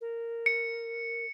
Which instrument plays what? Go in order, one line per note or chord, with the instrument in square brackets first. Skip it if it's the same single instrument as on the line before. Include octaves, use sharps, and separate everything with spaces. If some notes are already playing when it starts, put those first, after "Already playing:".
[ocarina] A#4
[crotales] C#7